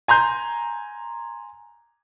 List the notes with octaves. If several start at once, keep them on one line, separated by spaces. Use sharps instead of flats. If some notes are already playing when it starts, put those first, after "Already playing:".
G#5 A#5 C6 G6